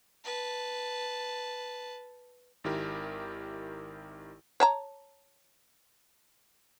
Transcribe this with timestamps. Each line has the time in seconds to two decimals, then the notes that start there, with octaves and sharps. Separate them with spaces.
0.24 B4 A5
2.64 G#1 D#3 E4 G4 A#4
4.60 C#5 A5 A#5